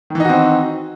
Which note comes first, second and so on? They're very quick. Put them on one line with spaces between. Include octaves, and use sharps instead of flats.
D#3 E3 D#4 F#4 C4